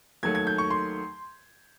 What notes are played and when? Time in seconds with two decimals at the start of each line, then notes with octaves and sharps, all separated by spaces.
0.23 D#2 D#3 F#3 A3 G#6
0.35 G#6
0.47 G6
0.58 C#6
0.70 C6